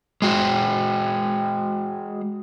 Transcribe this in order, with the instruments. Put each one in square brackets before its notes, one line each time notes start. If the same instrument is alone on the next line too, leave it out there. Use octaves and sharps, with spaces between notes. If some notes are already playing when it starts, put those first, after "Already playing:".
[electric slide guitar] G#3 F#4